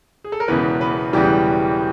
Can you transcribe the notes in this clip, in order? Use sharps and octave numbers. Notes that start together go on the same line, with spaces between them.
G#4
A4
A#4
E1 E2 C#3 E3 B3 B4
B3 B4
E1 E2 C#3 E3 G3 G4